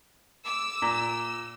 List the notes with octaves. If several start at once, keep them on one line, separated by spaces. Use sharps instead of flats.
D6 E6
A#2